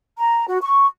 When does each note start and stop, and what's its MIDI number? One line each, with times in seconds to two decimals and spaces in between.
0.19 0.44 82
0.47 0.60 66
0.62 0.86 85